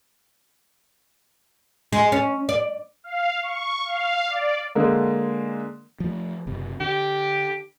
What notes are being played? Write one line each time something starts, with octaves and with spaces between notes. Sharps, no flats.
G#3
C#4
D5
F5
C#6
F5
D5
D3 G#3 A#3
F3 A3
F#1 C3
D3 G4